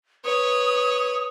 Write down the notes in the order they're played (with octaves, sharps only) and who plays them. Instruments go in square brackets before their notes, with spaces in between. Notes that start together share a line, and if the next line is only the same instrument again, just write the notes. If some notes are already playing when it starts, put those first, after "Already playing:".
[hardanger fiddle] B4 C#5 [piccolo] D#6